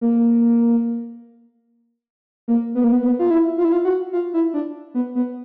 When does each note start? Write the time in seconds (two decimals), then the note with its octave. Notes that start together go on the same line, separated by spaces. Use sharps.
0.01 A#3
2.48 A#3
2.75 B3
2.84 A#3
2.92 B3
3.03 B3
3.19 F4
3.31 E4
3.58 F4
3.65 E4
3.72 F4
3.85 F#4
4.13 F4
4.34 E4
4.54 D4
4.94 B3
5.15 B3